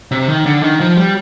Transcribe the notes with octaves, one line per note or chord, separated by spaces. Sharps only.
C3
D#3
D3
D#3
F3
G3